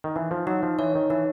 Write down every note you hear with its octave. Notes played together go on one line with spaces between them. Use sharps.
D#3
E3 D#4
F3
F#3 D#4
F3
E3 C#5
D#3
E3 D#4